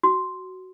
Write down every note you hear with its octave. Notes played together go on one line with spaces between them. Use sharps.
F#4